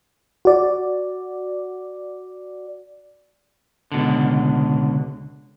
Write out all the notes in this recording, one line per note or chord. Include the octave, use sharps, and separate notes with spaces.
F#4 D5
C#2 B2 D3